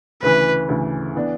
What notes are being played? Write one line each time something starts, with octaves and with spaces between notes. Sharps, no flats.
D2 C#3 E3 B4
D2 C#3 E3
E3 B3 D4